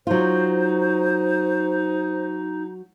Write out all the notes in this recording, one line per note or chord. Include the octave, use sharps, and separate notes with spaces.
F#3 D#4 F4 C5